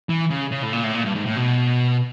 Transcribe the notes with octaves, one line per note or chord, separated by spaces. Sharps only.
E3
C#3
C#3
A2
A#2
A2
A#2
G2
G#2
A2
B2